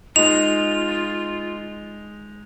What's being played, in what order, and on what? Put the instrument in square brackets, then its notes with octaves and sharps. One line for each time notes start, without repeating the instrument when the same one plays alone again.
[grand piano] G#3 D#4 [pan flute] F4 [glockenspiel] F7